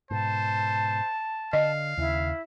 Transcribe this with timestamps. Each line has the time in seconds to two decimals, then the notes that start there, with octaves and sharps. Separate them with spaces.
0.11 G#2 B2 C5 A5
1.53 D3 D#5 F5
1.97 D#2 C#3 E4